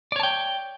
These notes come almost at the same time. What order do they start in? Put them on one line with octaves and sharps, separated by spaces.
D5 C#5 A5 G5